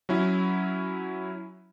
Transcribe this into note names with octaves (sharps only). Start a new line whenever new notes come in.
F#3 C#4 E4